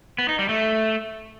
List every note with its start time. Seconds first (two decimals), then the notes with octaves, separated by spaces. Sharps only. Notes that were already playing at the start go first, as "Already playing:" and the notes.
0.19 B3
0.29 D#4
0.39 G3
0.49 A3